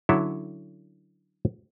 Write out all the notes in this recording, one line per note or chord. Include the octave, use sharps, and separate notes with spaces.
D3 F#3 C#4 E4 A4